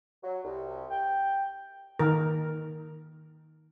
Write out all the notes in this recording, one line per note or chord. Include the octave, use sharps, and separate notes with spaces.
F#3
C2
G5
D#3 A#4